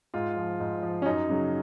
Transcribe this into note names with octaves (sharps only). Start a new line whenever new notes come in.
G#2 F4
F3
G#2
F3
C#4
F#2 D#4
C#3 F#3